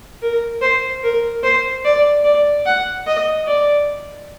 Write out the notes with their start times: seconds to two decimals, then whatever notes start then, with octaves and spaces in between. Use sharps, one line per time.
0.22 A#4
0.62 C5
1.03 A#4
1.43 C5
1.85 D5
2.25 D5
2.66 F#5
3.07 D#5
3.47 D5